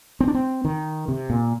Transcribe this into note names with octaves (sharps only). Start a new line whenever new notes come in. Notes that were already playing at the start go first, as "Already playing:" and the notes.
C4
D4
C4
D#3
C3
A#2